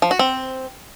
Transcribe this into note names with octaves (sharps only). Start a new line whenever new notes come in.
F3
F#4
C4